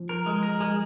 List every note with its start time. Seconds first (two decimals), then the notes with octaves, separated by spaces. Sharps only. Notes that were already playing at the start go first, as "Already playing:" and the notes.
Already playing: F3
0.09 A#4
0.26 G#3
0.43 A#4
0.61 G#3